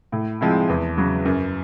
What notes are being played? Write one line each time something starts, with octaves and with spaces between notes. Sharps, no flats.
A2
F3 G#3 C4 E4
E2
C#3 F#3
F#2